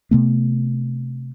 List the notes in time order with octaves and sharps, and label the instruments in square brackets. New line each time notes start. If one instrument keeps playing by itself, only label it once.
[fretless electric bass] C3 A3 B3